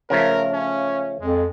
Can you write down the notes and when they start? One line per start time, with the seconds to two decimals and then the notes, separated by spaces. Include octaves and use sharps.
0.10 C#3 F3 A3 A#4
0.53 C#4
1.21 F2 G#3